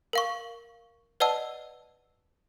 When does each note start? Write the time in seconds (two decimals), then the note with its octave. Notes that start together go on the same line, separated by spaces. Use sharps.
0.13 A#4 F5 C#6
1.20 B4 D5 D#5 F#5 A5 E6